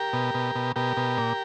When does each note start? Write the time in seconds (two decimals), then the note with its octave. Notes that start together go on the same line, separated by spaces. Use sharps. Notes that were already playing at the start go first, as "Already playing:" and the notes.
Already playing: G4 A#4
0.13 B2
0.34 B2
0.55 B2
0.76 B2 G4 A#4
0.97 B2
1.18 A#2